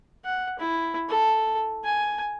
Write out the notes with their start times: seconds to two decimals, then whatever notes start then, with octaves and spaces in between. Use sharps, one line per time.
0.25 F#5
0.59 E4
1.09 A4
1.84 G#5